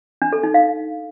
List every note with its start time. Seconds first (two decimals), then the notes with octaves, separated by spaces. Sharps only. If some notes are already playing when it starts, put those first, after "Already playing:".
0.22 D4
0.33 A4
0.43 D#4
0.54 F5